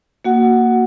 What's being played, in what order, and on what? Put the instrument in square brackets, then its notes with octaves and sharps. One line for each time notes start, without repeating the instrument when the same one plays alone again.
[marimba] A#3 F#4 F#5